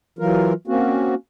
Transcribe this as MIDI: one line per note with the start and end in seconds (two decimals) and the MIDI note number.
0.19 0.53 52
0.19 0.53 54
0.19 0.53 65
0.19 0.53 70
0.68 1.15 58
0.68 1.15 60
0.68 1.15 61
0.68 1.15 66